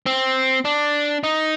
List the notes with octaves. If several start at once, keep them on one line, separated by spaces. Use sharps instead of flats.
C4
D4
D#4